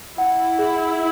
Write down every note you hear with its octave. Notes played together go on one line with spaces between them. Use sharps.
E4 F#5
G#4